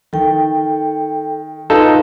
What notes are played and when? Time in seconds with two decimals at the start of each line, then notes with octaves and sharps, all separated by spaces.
0.13 D#3 A4 G5
1.70 D#4 F4 A4 B4